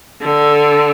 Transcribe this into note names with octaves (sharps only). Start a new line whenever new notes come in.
D3